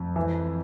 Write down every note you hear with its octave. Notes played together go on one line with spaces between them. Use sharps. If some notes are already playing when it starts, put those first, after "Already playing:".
Already playing: F2
E3